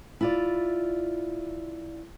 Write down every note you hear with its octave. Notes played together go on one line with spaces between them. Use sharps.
E4 F4 D5